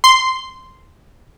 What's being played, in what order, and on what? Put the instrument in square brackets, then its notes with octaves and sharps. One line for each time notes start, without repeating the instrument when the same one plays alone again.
[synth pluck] C6